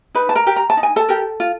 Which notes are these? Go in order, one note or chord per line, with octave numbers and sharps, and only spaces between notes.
D#4 B4 B5
A5
A#4 A#5
G4 A#4
A#5
A5
D#4
G#5
A4 A5
G4 A#4
F4